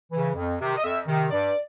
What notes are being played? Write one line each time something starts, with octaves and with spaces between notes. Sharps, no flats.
C#3 E3
F2
C3 D#3
D#5
F2 E5
C3 D#3
G2 D5